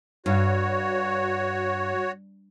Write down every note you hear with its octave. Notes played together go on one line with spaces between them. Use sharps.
G2 F#4 C#5